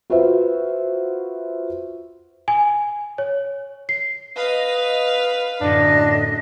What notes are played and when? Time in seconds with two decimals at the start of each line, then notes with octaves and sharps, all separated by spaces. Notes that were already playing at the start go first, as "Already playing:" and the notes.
0.10 F4 F#4 B4 C5 E5
2.48 G#5
3.18 C#5
3.89 C7
4.36 B4 D#5 F5
5.61 F#2 A2 D3 D4 D#5